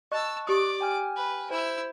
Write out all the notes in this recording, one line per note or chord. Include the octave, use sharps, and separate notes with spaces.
D#5 A5 C#6 E6 F#6
G4 D5 D6 D#6
G5 G#5 F6
B4
E4 C5 E6